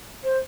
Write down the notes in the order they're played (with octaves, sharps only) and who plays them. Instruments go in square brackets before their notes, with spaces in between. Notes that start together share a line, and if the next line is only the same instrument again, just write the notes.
[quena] C5